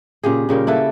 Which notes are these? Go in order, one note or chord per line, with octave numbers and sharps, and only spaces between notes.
A#2 C#3 G4 G#4
A#2 C#3 G3 A#4
A#3 E4 A4 B4